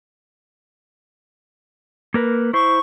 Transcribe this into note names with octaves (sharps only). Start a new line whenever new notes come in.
A#3 A#4 B4
E4 C5 C#6